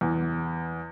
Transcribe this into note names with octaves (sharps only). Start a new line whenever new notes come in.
E2